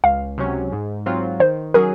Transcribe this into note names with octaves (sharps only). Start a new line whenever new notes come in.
C#2 F5
C3 F#3 C#4
G#2
F#3 C4 F4
D#3 C5
F#3 C#4 G#4 A#4